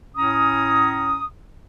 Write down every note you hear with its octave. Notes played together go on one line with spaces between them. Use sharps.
A2 C#4 A#5 D#6